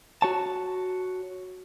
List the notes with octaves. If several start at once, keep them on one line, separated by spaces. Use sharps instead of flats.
F#4 C#5 A5